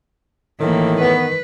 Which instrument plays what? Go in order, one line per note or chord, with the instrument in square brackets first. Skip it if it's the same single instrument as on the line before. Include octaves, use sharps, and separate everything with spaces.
[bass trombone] A2 [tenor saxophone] D#3 [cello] E3 A#3
[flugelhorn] B3 [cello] B4